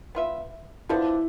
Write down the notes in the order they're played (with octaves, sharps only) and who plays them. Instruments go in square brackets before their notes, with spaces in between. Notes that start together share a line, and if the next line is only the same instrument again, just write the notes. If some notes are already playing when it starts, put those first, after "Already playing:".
[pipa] B3 F4 B4 E5
[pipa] D3 F3 B3 D4 [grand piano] E4